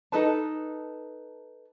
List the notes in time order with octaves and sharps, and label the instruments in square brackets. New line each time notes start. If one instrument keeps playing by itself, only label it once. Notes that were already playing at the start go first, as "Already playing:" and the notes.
[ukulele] D#4 A4 B4 A5